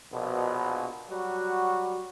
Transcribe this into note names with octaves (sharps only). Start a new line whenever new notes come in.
A#1 B2
F#3 G3 F#4